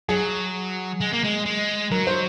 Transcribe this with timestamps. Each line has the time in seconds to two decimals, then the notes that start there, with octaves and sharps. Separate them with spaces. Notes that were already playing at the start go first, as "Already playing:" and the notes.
0.09 F#3 G#4
1.00 G#3
1.13 A#3
1.24 G#3
1.46 G#3
1.91 F#3 A#4
2.07 C5